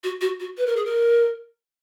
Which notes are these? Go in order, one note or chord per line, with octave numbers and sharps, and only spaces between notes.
F#4
F#4
F#4
B4
A#4
G#4
A#4